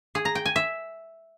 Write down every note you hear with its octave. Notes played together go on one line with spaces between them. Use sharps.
G#4
A#5
G5
G#5
E5